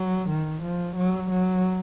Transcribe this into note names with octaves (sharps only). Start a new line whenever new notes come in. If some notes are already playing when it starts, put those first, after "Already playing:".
Already playing: F#3
D#3
F3
F#3
F#3